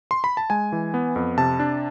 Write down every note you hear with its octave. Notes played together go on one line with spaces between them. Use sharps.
C6
B5
A5
G#3 G#5
E3
B3
F2
C3 A5
D4